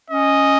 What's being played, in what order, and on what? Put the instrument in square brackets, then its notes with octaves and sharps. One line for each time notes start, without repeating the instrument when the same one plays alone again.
[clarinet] C#4 [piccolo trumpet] D#5